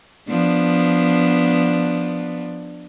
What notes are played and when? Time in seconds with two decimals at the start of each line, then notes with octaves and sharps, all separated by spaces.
0.29 F3 B3 D4